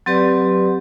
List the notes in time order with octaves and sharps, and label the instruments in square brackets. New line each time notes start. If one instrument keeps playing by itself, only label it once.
[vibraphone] F#3 C4 G4 B4 D5